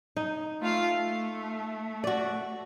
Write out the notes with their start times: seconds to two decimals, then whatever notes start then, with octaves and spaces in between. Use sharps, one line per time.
0.17 D#4
0.61 A3 F4 F5
0.98 A3
2.04 F#4 D5